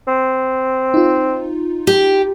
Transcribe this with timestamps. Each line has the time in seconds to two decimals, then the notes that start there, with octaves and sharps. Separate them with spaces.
0.08 C4
0.94 D#4 F4
1.87 G4